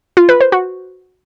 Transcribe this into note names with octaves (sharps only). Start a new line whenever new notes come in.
F4
B4
C5
F#4